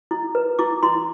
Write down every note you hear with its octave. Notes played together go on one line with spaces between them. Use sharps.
E4
B4
E4 D6
E4 C6